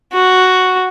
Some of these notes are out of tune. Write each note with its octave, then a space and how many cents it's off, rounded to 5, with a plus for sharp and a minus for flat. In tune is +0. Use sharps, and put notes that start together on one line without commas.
F#4 +0